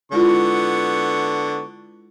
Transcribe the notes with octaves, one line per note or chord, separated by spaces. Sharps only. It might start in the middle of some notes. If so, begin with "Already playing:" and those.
D3 G#3 B3 E4 F4 C#6